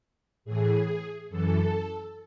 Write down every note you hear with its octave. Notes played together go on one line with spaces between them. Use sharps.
A2 E3 G#4
F#2 E3 A4